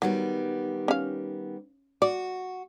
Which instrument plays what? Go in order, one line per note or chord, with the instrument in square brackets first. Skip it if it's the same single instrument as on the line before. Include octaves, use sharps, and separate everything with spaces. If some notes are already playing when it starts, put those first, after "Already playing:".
[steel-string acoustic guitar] D#3 G3 B3 [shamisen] F#3
[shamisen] C#4 F5
[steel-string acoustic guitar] F#4 [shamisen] D5